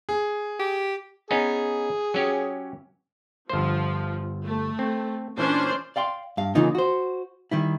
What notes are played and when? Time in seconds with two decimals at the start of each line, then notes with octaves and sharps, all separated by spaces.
0.09 G#4
0.59 G4
1.31 B3 C#4 D#4 G#4
2.14 F#3 C#4 G4
3.50 G1 F3 C5
4.44 A3
4.79 C4
5.38 A#2 E3 C#4 D4 C5
5.96 D5 F5 G5 C6
6.37 G2 F5
6.55 C#3 E3 A#3 D#4 F4
6.75 F#4 C5
7.51 D#3 G3 E4